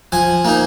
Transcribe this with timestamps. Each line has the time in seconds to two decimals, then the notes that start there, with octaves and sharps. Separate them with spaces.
0.12 F3 G#5
0.45 A#3 D#4